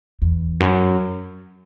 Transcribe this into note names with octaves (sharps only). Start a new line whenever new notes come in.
E2
F#2